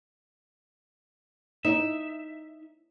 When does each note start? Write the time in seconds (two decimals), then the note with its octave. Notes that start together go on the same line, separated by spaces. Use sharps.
1.65 D#4 E5